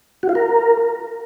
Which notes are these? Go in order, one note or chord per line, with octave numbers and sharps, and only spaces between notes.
F#4
F4
A#4